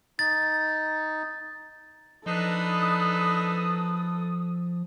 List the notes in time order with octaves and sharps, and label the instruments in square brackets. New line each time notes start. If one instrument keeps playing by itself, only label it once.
[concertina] D#4 [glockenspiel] A6
[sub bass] F3 [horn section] D4 D#4 B4 [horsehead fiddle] A4 [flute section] D#6